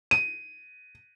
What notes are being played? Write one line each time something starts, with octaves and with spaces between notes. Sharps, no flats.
D#7